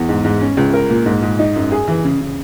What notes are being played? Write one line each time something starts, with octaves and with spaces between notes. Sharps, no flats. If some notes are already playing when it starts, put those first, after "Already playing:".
Already playing: E2
G#2
G#2
C#4
C#2
A#4
A#2
G#2
G#2
D#4
F#2
G#4
E3
C#3
C#3